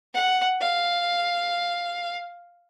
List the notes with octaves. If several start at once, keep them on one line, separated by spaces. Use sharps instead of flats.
F#5
F5